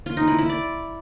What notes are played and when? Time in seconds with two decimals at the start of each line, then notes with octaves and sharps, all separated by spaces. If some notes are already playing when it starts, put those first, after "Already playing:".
0.06 F4
0.17 D#4
0.28 E4
0.38 E4
0.49 D5